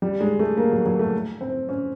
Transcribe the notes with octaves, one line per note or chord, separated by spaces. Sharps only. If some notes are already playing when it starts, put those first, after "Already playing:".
G3
G#3
A3
A#3
F#3
F#3
A3
C4
C#4